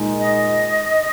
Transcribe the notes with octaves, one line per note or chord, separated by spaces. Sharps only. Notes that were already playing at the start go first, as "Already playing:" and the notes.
Already playing: A#2 G#3 D#4
D#5